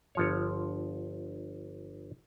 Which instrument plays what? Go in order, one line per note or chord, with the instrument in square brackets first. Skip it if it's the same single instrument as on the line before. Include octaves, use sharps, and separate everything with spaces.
[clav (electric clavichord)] G1 F3 C#5